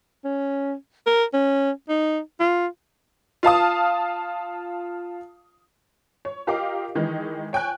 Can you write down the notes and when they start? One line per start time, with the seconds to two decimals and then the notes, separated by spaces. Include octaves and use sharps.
0.25 C#4
1.07 A#4
1.34 C#4
1.89 D#4
2.40 F4
3.43 F4 F5 A5 D#6
6.25 C#5
6.47 F4 G4 A#4 D#5 F5 D6
6.95 D#3 E3 G#3 D#4
7.53 C#5 G5 G#5 F#6